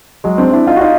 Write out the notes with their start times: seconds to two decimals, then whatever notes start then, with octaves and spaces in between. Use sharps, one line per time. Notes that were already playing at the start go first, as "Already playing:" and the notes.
0.24 F#3 G#3
0.38 C4 D4
0.52 D4 E4
0.67 D#4 F4
0.76 F#4
0.81 D#4 F4